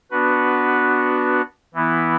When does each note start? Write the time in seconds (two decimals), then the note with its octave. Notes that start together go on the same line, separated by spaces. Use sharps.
0.11 B3 D4 F#4 B4
1.74 E3 B3 E4